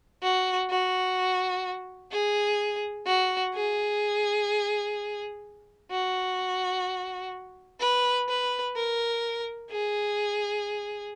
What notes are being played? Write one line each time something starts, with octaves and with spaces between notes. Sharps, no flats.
F#4
F#4
G#4
F#4
G#4
F#4
B4
B4
A#4
G#4